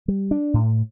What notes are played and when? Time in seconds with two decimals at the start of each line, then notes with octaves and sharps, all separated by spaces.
0.08 G3
0.31 D4
0.54 A2